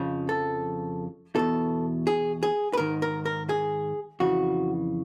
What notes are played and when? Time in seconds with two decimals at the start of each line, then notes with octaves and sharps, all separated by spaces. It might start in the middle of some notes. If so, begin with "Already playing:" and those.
Already playing: F2 C#3 F3
0.29 A4
1.35 E2 B2 A4
2.07 G#4
2.43 G#4
2.73 B4
2.77 G#2 D#3 A#4
3.02 A#4
3.25 A#4
3.49 G#4
4.20 F2 C#3 E3 F#4